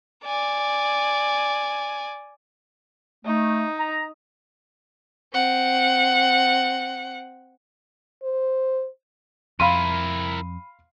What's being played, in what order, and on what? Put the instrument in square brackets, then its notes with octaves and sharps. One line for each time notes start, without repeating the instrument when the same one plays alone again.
[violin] D5 G#5
[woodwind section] A3 [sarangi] D#4
[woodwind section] A#5
[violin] C4 F#5
[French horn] C5
[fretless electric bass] F2 [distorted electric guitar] E4 A#4 [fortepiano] F5 C6 [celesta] B5 D#7